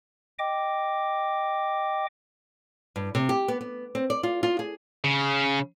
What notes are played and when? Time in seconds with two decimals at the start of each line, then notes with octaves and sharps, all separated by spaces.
0.39 D#5 G5 D6
2.96 G2
3.15 C3
3.29 G4
3.48 B3
3.61 B3
3.95 C4
4.10 D5
4.23 F4
4.43 F4
4.59 G#4
5.04 C#3